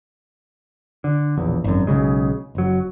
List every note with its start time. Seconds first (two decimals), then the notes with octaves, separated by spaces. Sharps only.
1.04 D3
1.37 E1 A#1 E2
1.64 G#1 F#2
1.87 B1 C#3 G#3
2.55 F#1 F#3